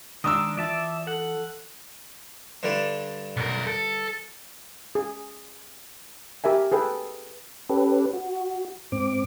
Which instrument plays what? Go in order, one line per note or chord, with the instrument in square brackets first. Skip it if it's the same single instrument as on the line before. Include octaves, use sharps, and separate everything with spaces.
[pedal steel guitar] D#3 D4 [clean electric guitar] G#3 A#5 C6 [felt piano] D#6 E6
[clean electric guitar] E3 F4 [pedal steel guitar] D5 E5 A5
[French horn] A4 [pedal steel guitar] F#5
[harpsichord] G2 D3 G3
[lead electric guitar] B1 A#4
A4
[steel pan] G#4
G4 A#4 E5 G#5
G#4 A4 B4 G5
[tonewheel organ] C#4 G4 A4 B4
F#4
G#2 C4 D6